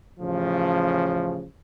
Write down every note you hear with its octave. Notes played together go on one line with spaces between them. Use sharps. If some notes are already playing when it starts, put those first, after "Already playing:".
A1 C#3 F3